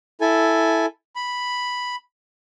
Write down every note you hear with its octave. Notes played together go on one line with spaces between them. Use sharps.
E4 A4 G#5
B5